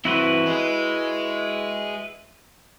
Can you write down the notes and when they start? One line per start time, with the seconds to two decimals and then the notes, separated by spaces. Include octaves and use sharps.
0.05 E3 C4 E4 F#4 B4
0.48 G#4 D#5